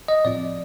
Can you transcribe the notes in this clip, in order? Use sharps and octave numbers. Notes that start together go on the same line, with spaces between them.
D#5
A2 F3 C4 F4 D5